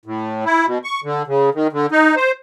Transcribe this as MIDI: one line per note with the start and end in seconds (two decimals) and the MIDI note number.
0.06 0.45 45
0.45 0.66 64
0.67 0.78 47
0.84 1.00 85
1.04 1.23 50
1.27 1.50 49
1.55 1.67 51
1.73 1.86 50
1.92 2.15 63
2.16 2.31 72